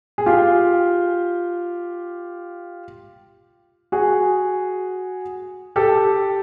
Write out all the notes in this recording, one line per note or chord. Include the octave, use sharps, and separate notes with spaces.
G#4
F4 G4
F#4 G#4
G4 A4